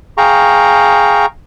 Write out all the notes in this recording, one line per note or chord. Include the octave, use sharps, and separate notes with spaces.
G#4 F5 G5 A#5 C#6